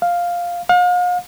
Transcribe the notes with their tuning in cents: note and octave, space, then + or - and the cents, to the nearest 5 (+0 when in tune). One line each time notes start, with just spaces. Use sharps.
F5 +0
F5 +40